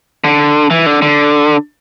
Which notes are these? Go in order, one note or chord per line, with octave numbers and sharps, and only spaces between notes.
D3
E3
D3
D3